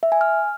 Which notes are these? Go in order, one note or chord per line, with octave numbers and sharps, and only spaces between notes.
E5
G#5
F6